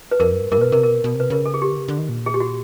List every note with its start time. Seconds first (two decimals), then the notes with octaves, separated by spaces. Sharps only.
0.11 B4
0.20 F2 A#4
0.32 F#2
0.41 G2
0.52 G2 A#4
0.58 A#2
0.61 B2 B4
0.72 C3 A#4
0.83 B2 A#4
1.04 B2
1.15 C3
1.20 B4
1.30 C#3 A#4
1.46 A4
1.54 G#4
1.62 G4
1.70 D3
1.77 C#3
1.88 D3
1.98 D#3
2.09 A#2
2.26 G#4
2.34 G4
2.40 F#4